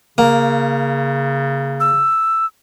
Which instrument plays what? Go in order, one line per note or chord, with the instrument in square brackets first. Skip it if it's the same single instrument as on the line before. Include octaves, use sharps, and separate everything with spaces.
[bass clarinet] C#3 [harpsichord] A#3
[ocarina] E6